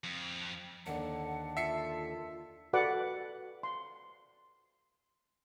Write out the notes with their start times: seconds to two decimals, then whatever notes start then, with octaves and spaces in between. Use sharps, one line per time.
0.04 F2
0.86 D#2 D3 F#5 A5
1.57 F4 E5 C7 C#7
2.73 F#4 A4 B4 D5 F#5 D6
3.63 C6